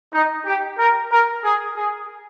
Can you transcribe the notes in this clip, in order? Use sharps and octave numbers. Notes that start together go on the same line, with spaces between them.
D#4
G4
A#4
A#4
G#4
G#4